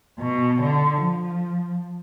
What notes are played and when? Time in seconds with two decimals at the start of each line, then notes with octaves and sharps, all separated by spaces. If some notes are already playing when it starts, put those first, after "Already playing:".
0.20 B2
0.61 D3
1.02 F3